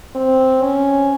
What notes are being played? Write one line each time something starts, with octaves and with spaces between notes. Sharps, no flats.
C4
C#4